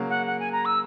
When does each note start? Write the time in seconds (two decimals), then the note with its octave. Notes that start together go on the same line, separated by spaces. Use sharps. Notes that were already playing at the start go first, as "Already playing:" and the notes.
Already playing: C#3 F#3 A#3
0.09 F#5
0.26 F#5
0.40 G#5
0.52 A#5
0.65 E6